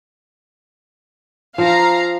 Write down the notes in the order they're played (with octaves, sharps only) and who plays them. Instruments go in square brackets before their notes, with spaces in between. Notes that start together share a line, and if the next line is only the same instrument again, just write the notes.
[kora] F3 [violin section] F5 A#5